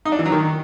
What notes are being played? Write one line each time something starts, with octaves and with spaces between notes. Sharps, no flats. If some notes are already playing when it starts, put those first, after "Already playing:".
D#4
D4
E3
F#3
D#3